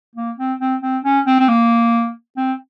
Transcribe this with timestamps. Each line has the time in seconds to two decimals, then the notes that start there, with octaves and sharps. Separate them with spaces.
0.16 A#3
0.38 C4
0.60 C4
0.82 C4
1.04 C#4
1.27 C4
1.40 C4
1.48 A#3
2.37 C4